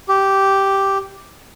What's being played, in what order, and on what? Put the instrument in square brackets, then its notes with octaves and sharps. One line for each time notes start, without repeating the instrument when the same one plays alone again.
[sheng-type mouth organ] G4